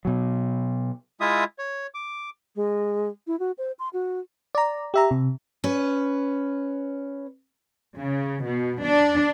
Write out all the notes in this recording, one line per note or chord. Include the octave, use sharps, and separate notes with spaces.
B2 F#3
G#3 E4 F4 E5 D#6
C#5
D6
G#3
E4
F#4
C5
C6
F#4
D5 A#5
G4 E5 A#5
C3
C#4 B4
C#3
B2
D4